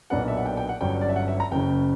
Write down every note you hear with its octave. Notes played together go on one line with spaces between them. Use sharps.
B1 A#2 F#3 B3 D4 F#5
E5
F#5
G5
G5
F#5
G1 G2 F#3 C#4 G5
D5
E5
F#5
E5
A#5
F#1 F#2 C#3 G5